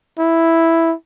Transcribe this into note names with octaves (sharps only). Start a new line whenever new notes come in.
E4